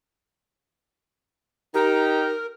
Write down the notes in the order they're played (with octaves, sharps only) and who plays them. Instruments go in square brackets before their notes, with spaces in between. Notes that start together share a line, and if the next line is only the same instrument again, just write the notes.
[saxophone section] D#4 G4 [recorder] A#4